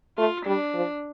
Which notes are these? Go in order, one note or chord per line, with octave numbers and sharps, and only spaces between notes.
A3 F4
G3 D4
F3